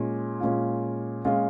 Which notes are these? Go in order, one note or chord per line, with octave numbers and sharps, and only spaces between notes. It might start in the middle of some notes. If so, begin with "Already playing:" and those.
Already playing: A#2 G#3 C#4
A#2 G#3 C#4 F4
A#2 G#3 C#4 F4